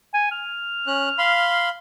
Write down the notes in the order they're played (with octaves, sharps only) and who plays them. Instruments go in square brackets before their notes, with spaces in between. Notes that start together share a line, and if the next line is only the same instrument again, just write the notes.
[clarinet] G#5
F6
[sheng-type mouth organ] C#4 F#6
F5 B5 C6